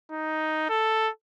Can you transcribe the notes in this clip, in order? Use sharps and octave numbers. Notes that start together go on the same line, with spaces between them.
D#4
A4